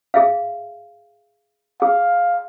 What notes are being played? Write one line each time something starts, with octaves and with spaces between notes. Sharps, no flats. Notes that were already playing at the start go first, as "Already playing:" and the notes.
G#4 E5 F5
G#4 F5